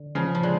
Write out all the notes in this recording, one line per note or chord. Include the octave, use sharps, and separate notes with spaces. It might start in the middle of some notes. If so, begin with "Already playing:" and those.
Already playing: D3
C#3 F3
F3
D3 G#3